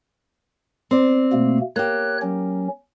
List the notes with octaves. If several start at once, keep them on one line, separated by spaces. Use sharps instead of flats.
C4 D5
B2 A3 A#3
A#3 G4 C#5 F#6
F#3 C#4